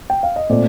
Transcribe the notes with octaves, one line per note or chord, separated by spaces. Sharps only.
G5
F5
D#5
A#2 A3 C4 D5